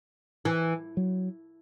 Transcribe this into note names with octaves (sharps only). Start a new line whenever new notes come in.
E3
F#3